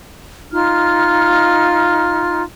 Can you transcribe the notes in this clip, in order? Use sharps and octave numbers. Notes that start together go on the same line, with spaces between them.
D#4 F4 F6